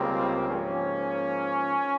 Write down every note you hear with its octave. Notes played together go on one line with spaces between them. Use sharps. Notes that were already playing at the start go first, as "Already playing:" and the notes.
Already playing: C#2 C#3 G3 A#3 C4
G#2 F3 A#3 C#4